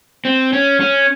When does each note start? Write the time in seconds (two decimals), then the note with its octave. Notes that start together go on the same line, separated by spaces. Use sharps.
0.25 C4
0.53 C#4
0.80 C#4